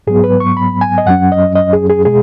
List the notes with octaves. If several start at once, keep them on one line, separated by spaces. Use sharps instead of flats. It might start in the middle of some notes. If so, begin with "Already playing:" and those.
G#2 F#3 B3 G#4
B4
C#6
B5
G#5
D#5
F#2 F#3 C#4 F#5
D#5
D#5
G#4
G#4
B2 G#3 G#4